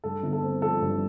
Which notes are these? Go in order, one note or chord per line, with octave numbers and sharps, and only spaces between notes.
G2 A4
G1
A4
C4
F3 A4
G2